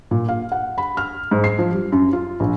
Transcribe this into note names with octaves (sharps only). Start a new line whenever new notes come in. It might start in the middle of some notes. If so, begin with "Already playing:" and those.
A#2
F5
F#5
B5
F6
G#2
C7
F3
G3
F#2
F4
A#1